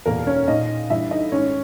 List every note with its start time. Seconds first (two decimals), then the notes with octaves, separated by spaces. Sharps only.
0.06 E2 B2 A#3 A#4
0.27 C#4 C#5
0.48 A#2 D#4 D#5
0.90 G2 E3 E4 E5
1.11 D#4 D#5
1.32 G#2 D#3 C#4 C#5